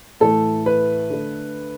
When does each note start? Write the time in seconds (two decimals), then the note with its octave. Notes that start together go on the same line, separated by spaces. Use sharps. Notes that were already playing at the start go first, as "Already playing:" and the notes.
0.20 A2 E3 A3 A4
0.66 B4
1.10 D3 A3